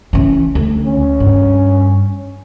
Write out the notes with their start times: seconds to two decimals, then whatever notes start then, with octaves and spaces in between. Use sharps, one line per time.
0.13 E3 C#4
0.55 D2
0.86 C#4
1.20 G2